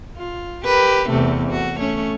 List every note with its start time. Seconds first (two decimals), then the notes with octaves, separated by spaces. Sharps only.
0.17 F4
0.65 G4 A#4 B4
1.09 E2 C3 A3
1.49 A3 F#4
1.78 A3 C#4 C#5